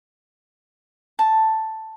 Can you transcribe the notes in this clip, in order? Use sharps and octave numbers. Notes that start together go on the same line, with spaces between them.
A5